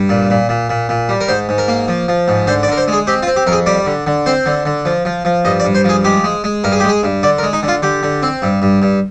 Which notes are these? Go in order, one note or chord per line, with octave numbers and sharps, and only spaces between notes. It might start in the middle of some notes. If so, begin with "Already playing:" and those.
Already playing: G2
A#2
A#2
A#2
A#2
A#2
G3
A#4
G#2 C5
G#2
A#4
A#3
F3
F3
G#2
D3 C5
D5
D3 A#4
C5
G#3 G#4
C4 G4
F4
C4
G4
F2 A#4
G#4
G3 D5
D3
D3
C4 C5
D3
D3
F3
F3
F3
G2 D#5
D5
G2
C5
F3 G#4
G#3 G4
G#3
G#3
G2 A#4
G#4
G4
G#3
G#4
G2
D3 D5
A#4
G#3
D#4
D3
F4
D3 G4
D3
C4
G2
G2
G2